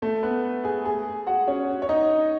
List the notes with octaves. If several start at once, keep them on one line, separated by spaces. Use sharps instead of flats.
A3 A4
B3 B4
G#4 G#5
G#4 G#5
F#4 F#5
C#4 C#5
C#5
D#4 D#5